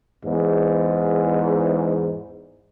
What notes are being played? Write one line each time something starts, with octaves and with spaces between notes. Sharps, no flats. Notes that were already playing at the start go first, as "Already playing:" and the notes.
E2 G#2